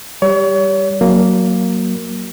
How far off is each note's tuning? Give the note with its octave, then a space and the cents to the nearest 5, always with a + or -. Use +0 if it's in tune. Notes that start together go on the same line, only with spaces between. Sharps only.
G3 +0 C#5 +35
F#3 +0 A#3 +0